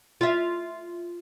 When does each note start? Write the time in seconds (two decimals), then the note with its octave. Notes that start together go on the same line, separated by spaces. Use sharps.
0.21 F4 E5